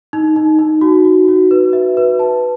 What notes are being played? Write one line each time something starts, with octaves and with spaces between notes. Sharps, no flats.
D#4
D#4
D#4
F#4
F#4
F#4
B4
E5
B4
A5